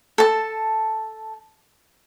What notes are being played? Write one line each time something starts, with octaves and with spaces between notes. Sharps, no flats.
A4 A5